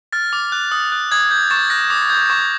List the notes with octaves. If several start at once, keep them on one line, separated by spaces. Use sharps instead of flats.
F6 A6
D6
F#6
D#6
F#6
D#6 G#6
G6
C#6 A6
F#6 A#6
D6
G6
C#6